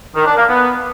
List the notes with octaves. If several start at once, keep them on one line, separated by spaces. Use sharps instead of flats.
D#3
D4
A#3
B3